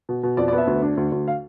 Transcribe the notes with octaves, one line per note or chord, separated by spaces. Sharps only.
B2
B2
F2 D5
D5
B3
E5
D2
D4
D2
D2
F5